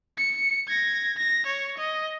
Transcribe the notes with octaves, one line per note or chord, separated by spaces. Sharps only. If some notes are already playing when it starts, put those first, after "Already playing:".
C#7
G#6 A#6
A#6
C#5
D#5